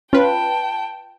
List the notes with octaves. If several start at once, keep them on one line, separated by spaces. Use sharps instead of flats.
C#4 F4 B4 G5 A5